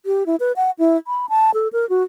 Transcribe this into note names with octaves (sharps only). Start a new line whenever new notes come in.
G4
E4
B4
F#5
E4
B5
A5
A4
A#4
F#4